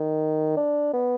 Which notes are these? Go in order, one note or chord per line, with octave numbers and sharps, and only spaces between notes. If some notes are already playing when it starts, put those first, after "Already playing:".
Already playing: D#3
D4
B3